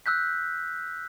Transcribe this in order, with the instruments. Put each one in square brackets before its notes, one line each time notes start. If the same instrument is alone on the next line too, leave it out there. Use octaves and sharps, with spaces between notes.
[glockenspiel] E6 F#6 G6 B6